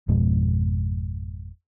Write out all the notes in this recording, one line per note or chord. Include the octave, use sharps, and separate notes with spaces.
G#1 F2 B2 G#3